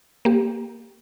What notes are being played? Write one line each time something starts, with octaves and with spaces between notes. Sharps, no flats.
A#3 G4